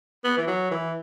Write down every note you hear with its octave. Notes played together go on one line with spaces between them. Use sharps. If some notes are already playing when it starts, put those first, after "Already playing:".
B3
E3
F#3
E3